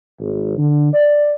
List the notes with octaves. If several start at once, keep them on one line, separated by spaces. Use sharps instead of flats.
G#1
D3
D5